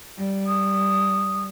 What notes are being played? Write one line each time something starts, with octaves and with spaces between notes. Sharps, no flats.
G3
D#6